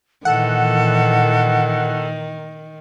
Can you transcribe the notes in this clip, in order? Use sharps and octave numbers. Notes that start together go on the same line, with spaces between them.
A#2 D#3 E3 A4 F#5